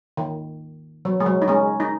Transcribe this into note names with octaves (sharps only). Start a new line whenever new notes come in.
D#3
F#3
G#3
F#3
D#4
G#3 C#4
D#4